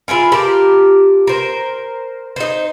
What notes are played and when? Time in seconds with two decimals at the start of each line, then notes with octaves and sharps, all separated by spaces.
0.08 E4 F4 G#4 A#4
0.32 F4 G4 A#4 A5
1.27 A#4 C5
2.36 D#4 C5